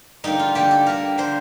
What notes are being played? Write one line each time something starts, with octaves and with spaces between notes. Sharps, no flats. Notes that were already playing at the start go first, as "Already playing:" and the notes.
D3 G3 A#3 D#4
F4
D3 G3 A#3 G4
A4
D3 G3 A#3 A#4
D3 G3 A#3 C5